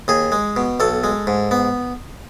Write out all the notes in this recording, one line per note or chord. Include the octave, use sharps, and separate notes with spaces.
D#2 G#4
G#3
B2
B1 A4
G#3
G#2
B3